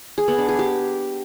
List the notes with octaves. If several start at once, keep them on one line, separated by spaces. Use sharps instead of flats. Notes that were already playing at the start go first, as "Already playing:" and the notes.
G#4
B3
D4
G#4
G4